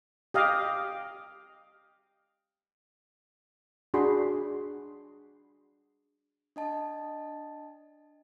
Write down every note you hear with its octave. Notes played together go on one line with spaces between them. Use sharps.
G4 D#5 F5
D4 F#4 G#4 B5 C6
D4 D#5 A5